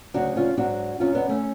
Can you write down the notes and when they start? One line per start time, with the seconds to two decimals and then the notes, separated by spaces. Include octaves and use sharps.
0.14 D2 C#3 F#3 D4 F#4
0.37 C#4 F4
0.57 G#2 F#3 D4 F#4
1.00 F#2 C#3 F#3 C#4 F4
1.15 B3 D4
1.29 A3 C#4